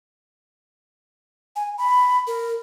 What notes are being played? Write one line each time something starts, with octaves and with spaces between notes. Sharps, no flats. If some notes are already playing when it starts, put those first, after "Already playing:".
G#5
B5
A#4